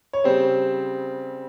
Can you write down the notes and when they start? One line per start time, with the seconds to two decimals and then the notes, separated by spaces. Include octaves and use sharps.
0.13 C#5
0.24 C#3 G3 C4 C5